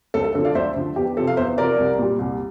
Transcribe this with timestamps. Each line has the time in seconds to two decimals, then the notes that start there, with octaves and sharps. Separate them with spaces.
0.14 D2 A4
0.24 A4
0.35 D3 F3 A4
0.45 D5 F5
0.55 D2 C5 E5
0.76 D3 F3
0.96 E2 G4
1.17 C3 F3 A4
1.27 F5
1.37 E2 C5 E5
1.57 C3 F3 A#4 D5
1.79 C2
1.98 A#2 G3
2.19 C2